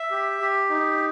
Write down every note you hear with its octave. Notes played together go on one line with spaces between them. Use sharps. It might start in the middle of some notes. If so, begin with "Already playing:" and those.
Already playing: E5
G4
G4
D#4